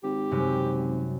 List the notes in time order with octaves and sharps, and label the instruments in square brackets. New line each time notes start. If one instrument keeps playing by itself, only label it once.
[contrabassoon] G#1 [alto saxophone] G4
[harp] F#2 C3 G3